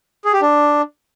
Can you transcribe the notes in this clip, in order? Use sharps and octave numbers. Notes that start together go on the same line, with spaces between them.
G#4
G4
D4